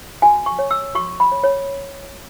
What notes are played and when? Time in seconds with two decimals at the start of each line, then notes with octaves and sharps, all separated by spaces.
0.22 F#4 G#5
0.46 C#6
0.59 C#5
0.71 E6
0.95 F#4 C#6
1.20 B5
1.32 C#5
1.43 C#5